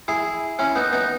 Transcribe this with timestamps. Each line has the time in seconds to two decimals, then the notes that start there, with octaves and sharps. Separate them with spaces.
0.08 E4 G#4
0.59 C#4 E4
0.76 B3 D#4
0.92 B3 D#4